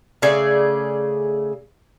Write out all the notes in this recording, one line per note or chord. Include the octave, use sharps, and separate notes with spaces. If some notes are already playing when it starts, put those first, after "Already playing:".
C#3 A3 G#4 D5